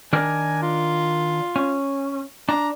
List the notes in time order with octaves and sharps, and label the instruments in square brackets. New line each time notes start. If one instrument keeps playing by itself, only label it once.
[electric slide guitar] D#3 D4 A#4 [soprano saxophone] G#5
[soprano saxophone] F4
[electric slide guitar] C#4
[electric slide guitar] D4 [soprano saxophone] A#5